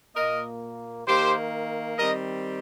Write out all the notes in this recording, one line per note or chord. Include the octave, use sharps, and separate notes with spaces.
A#2 A#3 A#4 D#5
D#3 A#3 G4 C5
D#3 G3 C4 A#4 D#5